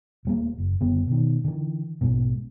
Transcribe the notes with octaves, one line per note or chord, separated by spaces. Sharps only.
D#1 A3 A#3
F#1
F#1 D3 B3
B2 D#3
D3 E3
A#1 G#2 B2